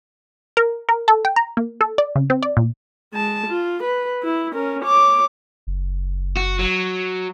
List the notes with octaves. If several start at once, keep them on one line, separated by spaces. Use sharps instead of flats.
A#4
A#4
A4
G5
A#5
A#3
A4
D5
C#3
C4
D5
A#2
G#3 A5
F4
B4
E4
C#4 A#4
C#5 D6
F#1
F#4
F#3